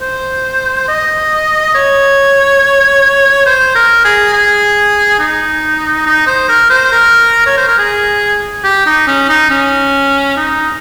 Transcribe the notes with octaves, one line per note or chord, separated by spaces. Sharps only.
C5
D#5
C#5
C5
A#4
G#4
G#4
D#4
D#4
C5
A#4
C5
A#4
C#5
C5
A#4
G#4
G4
D#4
C#4
D#4
C#4
D#4